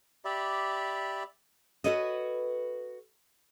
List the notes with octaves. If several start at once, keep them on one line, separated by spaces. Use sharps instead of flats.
G4 D5 E5 B5
F#4 A4 B4 C#5 D#5